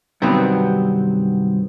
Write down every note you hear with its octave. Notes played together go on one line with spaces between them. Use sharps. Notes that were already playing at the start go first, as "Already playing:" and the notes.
G2 C3 D#3 F#3 B3 C4